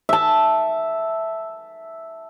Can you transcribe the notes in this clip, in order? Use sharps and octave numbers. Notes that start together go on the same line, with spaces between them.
E5 A5